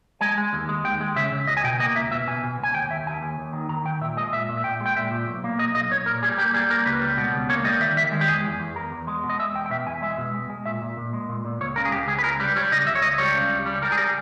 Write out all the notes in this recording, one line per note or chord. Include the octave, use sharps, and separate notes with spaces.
G#3 G#5
G#3
D#2
G#3
D#2 G5
G#3
C#3 E5
C#3
C#2 D#5
G#5
B2 G5
A#3 D#5
C#2 E5
B2 E5
B2 G#5
B2
C#2 G#5
D#2 G5
D#2 E5
D#2 G#5
D#2
D#2
D#3
D#3 A#5
D#3 G5
A#2 E5
G#3 D#5
A#2 E5
A#2
E5
A#2 G5
G#3
G5
A#2 E5
A#2
B1
A#3
B1 D#5
B1 D#5
B1 C#5
A#2 A#4
G3 G#4
A#3 G4
G3 G#4
A#3 A#4
C#2 B4
G3
B2
C#2
A#3 C#5
G3 D#5
D#3 E5
D#3 E5
G#3
G4
E2 G#4
E2
E2
E2 A#4
E2
G#3
B2
D#5
G#3 E5
E2 G5
G5
B2 E5
E2 G#5
G#3 E5
B2
G#3
G#3
A#2 E5
A#2
A#2
G#3
A#2
A#2
C#2 C#5
C#3 A#4
G#4
C#2 G4
C#2 G#4
B4
C#2 A#4
G3 B4
G3 C#5
C#3 D#5
C#2 E5
C#5
C#2 D#5
G3 C#5
C#3
C#2
G3
G3 A#4
G#4
G3 A#4